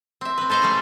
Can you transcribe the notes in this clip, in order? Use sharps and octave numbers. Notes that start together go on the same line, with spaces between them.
C4 E5
C4 B4
A4 B4 C5 D#5 F5
C#3 G3 A3